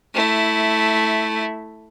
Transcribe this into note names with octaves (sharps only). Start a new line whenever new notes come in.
A3 E4